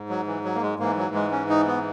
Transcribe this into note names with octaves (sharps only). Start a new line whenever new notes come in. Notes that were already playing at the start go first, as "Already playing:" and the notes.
Already playing: G#2
F#3
E3
F#3
A#3
G#3
G#2 E3 A#3
F#3
G#3
C#4
D#4
B3